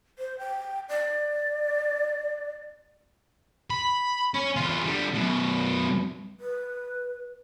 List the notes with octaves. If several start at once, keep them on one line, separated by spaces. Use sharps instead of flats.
C5
G5
D5
B5
C#4
E2 F4
D3 G3
F#2 B2
B4